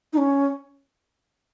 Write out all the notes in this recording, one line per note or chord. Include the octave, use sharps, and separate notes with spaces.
D#4
C#4